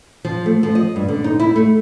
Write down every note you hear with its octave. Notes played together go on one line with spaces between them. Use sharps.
F3
A3
F3
D#5
G2
D3
D#4
E4
A3